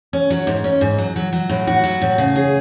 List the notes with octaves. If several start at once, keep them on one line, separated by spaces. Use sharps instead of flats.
C#4
F#3
G#2
C#4
G#2
F#3
F#3
F#3
A2
F#4
F#3
A2
C#3
G#4